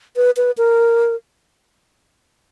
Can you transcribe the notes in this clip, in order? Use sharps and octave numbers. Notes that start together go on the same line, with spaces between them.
B4
B4
A#4